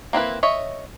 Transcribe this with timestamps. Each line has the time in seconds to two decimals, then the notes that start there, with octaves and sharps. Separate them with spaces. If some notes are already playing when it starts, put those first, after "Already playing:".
0.13 A#3 C4 E4 B4
0.43 C#5 D#5 E5